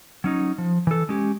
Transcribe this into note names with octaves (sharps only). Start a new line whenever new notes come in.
F#3 C#4 D#4
F3
E3 A4
G#3 C#4 G4